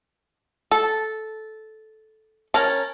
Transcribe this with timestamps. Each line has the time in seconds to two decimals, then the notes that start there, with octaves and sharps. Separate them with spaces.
0.71 A4
2.54 C#4 A#4 A5